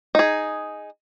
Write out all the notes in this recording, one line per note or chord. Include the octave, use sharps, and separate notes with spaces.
D#4 G#4